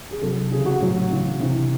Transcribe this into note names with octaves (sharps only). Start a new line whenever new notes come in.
G#4
C3 F#3 A4
C#3 E3 G#4
F#4
A2 F#3
C#3 E3
C3 E3